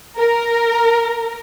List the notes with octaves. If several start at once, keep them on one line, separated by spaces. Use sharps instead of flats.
A#4